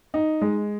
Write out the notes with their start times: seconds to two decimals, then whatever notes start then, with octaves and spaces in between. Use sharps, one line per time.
0.14 D#4
0.41 G#3